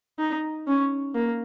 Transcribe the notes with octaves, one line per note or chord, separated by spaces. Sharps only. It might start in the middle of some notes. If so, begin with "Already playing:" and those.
D#4
C#4
A#3